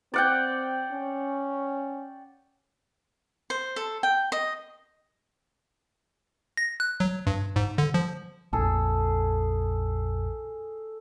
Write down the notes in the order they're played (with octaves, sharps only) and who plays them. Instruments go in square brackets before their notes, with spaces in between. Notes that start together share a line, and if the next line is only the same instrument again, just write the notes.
[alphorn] C4 [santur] D5 F#5 G5
[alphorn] C#4
[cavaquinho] C5
A4
G5
D#5
[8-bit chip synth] A#6
F#6
F#3
G2
G#2
D3
F3
[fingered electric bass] A#1 F2 [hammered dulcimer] G#4 A4